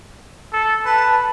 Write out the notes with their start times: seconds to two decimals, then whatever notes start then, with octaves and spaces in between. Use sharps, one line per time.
0.53 A4
0.85 B4 A5